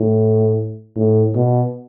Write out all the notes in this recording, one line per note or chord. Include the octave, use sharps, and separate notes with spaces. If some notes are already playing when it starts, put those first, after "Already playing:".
Already playing: A2
A2
B2